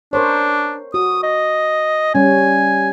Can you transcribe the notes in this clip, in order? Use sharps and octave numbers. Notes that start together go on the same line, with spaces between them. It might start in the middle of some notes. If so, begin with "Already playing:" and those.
D4 A#4 C5 C#5
F#4 D#6
D#5
G3 C#4 G#5